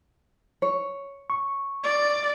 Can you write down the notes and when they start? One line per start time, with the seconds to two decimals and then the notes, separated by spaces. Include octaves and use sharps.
0.62 C#5
1.30 C#6
1.84 D5